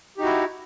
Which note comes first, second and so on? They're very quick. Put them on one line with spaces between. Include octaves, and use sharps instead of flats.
G4 D#4 F#4 E4